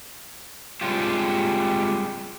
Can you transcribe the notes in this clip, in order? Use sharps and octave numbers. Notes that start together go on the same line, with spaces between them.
G3 G#3 C4 D4 F4 G4